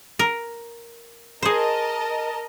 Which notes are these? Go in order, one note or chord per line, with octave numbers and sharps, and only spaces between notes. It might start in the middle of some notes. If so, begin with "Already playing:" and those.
A#4
G#4 A#4 C5 D#5 A5